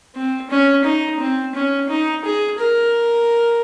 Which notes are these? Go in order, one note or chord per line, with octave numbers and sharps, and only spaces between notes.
C4
C#4
D#4
C4
C#4
D#4
G#4
A#4